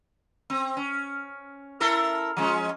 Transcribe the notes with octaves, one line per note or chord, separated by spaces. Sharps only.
C4
C#4
E4 A4 A#4
F3 G#3 C#4